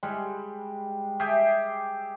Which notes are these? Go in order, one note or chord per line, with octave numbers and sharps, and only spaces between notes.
G3 G#3
G4 G#4 E5 G5